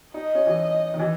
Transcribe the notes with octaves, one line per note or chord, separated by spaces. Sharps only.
D#4 D#5
C#4
E3
D#3
E3